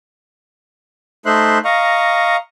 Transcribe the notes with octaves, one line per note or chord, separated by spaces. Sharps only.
A3 D#4 C5 E5 C6 F#6
D#5 F5 A#5 C#6